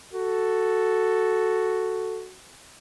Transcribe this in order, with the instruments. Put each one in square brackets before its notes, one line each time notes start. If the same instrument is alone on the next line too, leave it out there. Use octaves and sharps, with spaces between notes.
[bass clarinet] F#4 [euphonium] A4